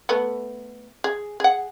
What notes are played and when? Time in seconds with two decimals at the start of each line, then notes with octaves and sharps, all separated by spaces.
0.09 A3 B3
1.04 G#4
1.40 G#4 F#5